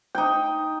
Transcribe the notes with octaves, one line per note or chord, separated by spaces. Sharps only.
D#4 G5